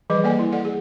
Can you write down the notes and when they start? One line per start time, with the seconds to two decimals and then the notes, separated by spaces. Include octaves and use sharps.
0.10 E3 F3 G3 G#4 B4 D#5
0.24 A#3 A4 D5 G#5
0.39 E4
0.52 A4 D5 F#5
0.65 G#4